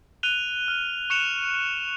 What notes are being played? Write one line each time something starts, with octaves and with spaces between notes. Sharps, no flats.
F#6 D#7 F7 G7
F6
C#6 F#6 C#7 E7 F7